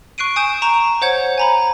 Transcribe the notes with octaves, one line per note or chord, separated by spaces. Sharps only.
C#6 F#6 C7 D7 D#7
G#5 D#6 G6 D7 E7
A#5 C#6 D7 E7
C5 C#5 F#5 G6 G#6
G#5 A#5 B5